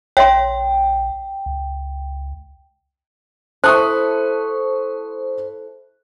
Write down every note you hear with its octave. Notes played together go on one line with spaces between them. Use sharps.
A#1 C#5 E5 G5 C6
C#2
E4 A4 C5 C#6 D#6 F#6